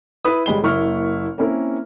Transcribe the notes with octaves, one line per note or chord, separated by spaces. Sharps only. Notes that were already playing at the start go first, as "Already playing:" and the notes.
E4 B4 D#6
G1 G3 G#3 B5 G7
F#1 A#3 E4 C#6 F6
A#3 C4 C#4 E4 A#4